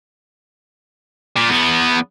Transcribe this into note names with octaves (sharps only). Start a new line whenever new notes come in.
A#2
E2 B3